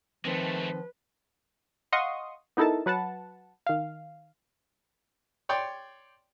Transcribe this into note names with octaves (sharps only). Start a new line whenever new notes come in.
D#3 F3 G#3 A3 C4 B4
D#5 F5 F#5 C6 C#6 D#6
B3 D#4 E4 A4 A#4 A5
F#3 B4 F#5 A5
D#3 F5
C#5 D5 G5 C6